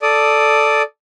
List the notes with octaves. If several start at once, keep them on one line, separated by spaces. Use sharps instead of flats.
A4 D5 D#6